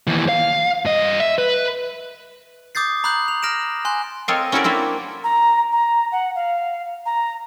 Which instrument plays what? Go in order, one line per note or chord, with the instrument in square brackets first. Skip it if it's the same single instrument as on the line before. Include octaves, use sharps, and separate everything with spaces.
[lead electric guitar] D#2 E3
F5
G2 D#5
E5
B4
[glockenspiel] D6 D#6 G6 A6 C7
A#5 B5 D#6 F#6 G6 F#7
F7
F6 A#6 D7 E7
G#5 C6 F#6
[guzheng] C4 A4 A#4 C#5 D#5 F5
C#4 E4 F#4 A4 A#4 D5
A#3 C4 D4 E4
[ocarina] A#5
A#5
F#5
F5
A#5